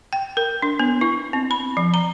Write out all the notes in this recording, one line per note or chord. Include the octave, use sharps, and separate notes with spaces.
G5
A#4
D4
B3
E4
C4
B5
F3
A#5